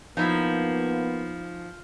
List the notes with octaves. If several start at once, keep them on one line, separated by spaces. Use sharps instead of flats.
F3 A#3 B3 D#4 E4